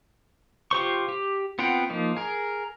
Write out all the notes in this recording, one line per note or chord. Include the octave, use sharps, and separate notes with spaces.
F4 G4 C5 C#6
G4
B3 C4 F4 F#5 G5
F3 A#3 D#4
G#4 A#4